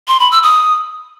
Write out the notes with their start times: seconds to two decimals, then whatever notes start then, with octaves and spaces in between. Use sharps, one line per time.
0.08 C6
0.20 B5
0.31 E6
0.43 D#6